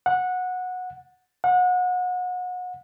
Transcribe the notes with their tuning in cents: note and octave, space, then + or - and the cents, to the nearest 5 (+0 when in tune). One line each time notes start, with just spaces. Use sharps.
F#5 -15
F#5 -30